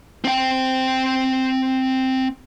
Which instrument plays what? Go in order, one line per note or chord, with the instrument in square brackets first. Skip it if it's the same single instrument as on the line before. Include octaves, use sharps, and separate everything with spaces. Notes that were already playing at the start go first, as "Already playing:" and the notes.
[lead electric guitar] C4 G5